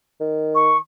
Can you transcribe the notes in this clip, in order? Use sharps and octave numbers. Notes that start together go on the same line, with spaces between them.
D#3
C#6